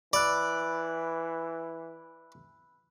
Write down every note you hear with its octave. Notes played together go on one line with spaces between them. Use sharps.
E3 D5 B5 E6 F#6